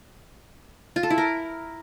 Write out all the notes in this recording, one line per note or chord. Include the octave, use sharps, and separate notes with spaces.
F4
A4
E4
A#4